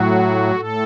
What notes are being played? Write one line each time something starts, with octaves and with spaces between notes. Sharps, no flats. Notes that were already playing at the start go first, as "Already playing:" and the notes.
Already playing: A2 F#3 F#4
A2 A4